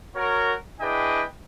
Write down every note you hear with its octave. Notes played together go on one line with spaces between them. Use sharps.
F#4 A#4 C#5
D4 E4 G#4 B4 D#5 G5